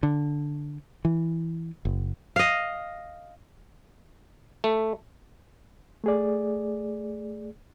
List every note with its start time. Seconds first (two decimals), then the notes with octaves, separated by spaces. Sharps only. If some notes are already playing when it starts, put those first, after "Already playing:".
0.03 D3
1.05 E3
1.85 F#1
2.36 D#5 F5
4.64 A3
6.04 A3 G#4 D5